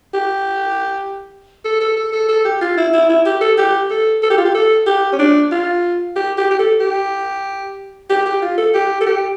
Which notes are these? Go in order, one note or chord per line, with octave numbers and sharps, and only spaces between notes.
G4
A4
A4
A4
A4
A4
G4
F4
E4
E4
E4
G4
A4
G4
A4
A4
G4
F4
G4
A4
G4
C#4
D4
F4
G4
G4
G4
A4
G4
G4
G4
F4
A4
G4
A4
G4